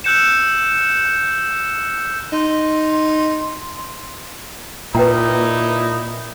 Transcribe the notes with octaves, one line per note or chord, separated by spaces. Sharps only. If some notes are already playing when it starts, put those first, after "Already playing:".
E6 F#6 G6 C#7 E7
D#4 C6
A#2 D#4 E4 B4 G5 A#5